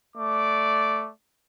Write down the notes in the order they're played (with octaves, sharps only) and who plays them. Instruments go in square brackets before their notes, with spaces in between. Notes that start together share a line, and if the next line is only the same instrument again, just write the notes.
[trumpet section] A3 D5 D6